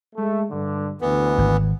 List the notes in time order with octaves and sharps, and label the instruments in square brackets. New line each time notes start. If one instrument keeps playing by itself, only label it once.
[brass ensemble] G#3 A3
G2 D3
[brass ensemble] D2 [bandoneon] E3 B3
[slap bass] G#1